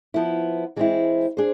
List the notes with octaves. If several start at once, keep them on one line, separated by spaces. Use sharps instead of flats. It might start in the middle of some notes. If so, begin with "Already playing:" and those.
F3 B3 E4
E3 G#3 C4 E4
D4 G#4 C5